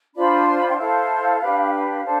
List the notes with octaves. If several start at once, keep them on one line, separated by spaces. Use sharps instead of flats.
D4 F4 C5 B5
C6
B5
G5
E4 A4 C5 F5
D4 G4 B4
F5
D4 A4 C5